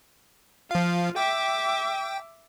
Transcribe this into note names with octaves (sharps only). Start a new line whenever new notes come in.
F3 F4 F5
E5 G5 D6